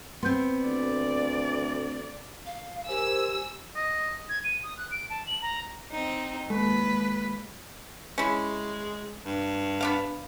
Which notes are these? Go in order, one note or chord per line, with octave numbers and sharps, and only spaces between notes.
B3 C4 C6 G6
D2 D5
F5
G4 A#4 C5 G#5 E6
D#5
G#6
D#7
D#6
F#6
D7
A5
F#7
A#5
C4 D#4
D#2 G#3 B4
G#3 C#4 E4
G2
B3 D4 F5